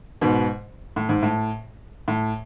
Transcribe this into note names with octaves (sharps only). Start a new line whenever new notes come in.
G#2 B2
A2
G#2
A2
A2